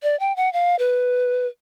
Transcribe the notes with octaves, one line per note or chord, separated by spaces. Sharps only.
D5
G5
F#5
F5
B4